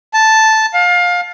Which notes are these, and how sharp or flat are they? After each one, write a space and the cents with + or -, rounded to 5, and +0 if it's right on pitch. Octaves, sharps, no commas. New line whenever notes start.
A5 -5
F5 +25